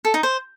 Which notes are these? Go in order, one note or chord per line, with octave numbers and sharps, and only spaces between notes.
A4
D#4
C5